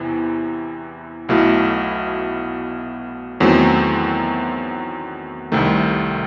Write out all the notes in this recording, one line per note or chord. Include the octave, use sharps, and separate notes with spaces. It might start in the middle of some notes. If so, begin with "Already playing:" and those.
Already playing: E2 C3 E3
B1 B2 A3 E4
E2 D#3 F#3 A3 C4
C2 C3 D#3 A3